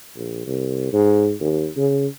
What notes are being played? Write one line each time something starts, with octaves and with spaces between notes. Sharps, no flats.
A#1
C2
G#2
D#2
C#3